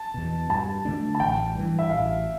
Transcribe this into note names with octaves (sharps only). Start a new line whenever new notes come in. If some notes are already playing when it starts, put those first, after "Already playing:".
Already playing: A5
E2 B2
G2 A5
D3 A3 D4
A5
A1 G5
G2 E3
E5
A1 F5